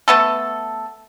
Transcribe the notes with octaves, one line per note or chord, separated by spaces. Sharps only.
A3 B3 A4